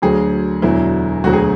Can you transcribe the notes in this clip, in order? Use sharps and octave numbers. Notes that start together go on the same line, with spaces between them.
D2 D3 F#3 G#4
E1 E2 D3 F#3 E4
E1 D2 D3 F#3 F#4
G#4